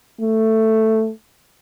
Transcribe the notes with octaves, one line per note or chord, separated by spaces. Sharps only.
A3